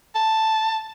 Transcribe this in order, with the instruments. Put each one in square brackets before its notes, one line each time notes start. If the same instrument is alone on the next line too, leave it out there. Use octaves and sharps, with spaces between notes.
[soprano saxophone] A5